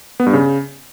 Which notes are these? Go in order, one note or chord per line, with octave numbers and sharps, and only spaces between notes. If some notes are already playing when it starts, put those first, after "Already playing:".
B3
G2
C#3